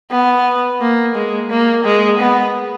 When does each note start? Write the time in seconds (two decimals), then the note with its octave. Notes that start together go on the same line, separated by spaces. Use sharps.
0.11 B3
0.81 A#3
1.15 G#3
1.50 A#3
1.85 G#3
2.20 B3